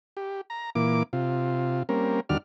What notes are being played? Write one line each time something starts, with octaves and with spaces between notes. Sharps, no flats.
G4
A#5
A#2 E3 A#3 D6
C3 F4
G3 A#3 C4 C#4 A#4
D#2 D3 G3 F#4 D5 F6